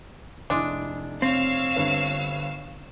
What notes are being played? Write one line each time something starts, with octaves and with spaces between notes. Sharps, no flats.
F1 G#3 D4 E4
C4 C#5 F5 E6
G1 G2 B4